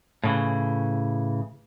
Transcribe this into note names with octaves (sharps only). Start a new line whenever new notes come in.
A2 C#3 E3